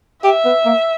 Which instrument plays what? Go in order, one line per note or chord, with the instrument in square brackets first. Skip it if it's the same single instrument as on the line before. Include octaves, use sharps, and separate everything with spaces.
[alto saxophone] G4 [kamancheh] E5
[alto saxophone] B3
A#3